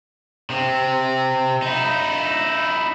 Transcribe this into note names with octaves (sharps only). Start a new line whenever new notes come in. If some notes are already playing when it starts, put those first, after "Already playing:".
C3 C4
D#4 E4